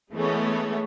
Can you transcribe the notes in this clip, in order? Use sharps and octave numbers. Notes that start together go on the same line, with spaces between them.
E3 G#3 A3 B3 C#4